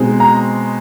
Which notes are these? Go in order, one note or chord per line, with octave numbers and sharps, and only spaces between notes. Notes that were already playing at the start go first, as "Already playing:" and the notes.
Already playing: B2 G#3 C4 D#4
A#5